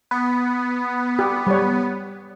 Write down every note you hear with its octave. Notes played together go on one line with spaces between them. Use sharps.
B3
G4
G3 C#5